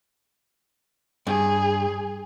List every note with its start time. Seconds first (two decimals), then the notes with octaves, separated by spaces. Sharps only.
1.27 G2 G#4